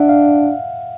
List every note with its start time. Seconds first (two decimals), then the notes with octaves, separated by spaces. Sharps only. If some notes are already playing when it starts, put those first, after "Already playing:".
Already playing: D4 E5 F#5
0.09 F5